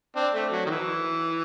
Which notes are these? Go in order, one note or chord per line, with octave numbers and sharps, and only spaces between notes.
C4 D4
A3
F#3
D#3
E3